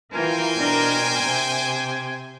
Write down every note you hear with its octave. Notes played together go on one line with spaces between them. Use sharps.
E3 F4 A#4 C5 G5 G#5
B2 D4 A#4
C3